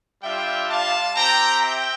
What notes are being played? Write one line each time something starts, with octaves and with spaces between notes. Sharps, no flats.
G3 D4 F4 E5 G5
F5 A5
C4 G4 G5 A#5
E5 G5